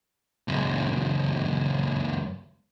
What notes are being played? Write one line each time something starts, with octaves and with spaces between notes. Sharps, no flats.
C#2 F#2